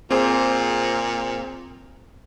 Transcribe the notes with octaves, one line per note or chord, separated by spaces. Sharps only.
A#2 C4 G#4 C5